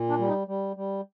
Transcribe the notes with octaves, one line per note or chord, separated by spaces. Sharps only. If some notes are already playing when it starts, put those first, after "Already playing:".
Already playing: A#2
D4
G3
D#4
G3
G3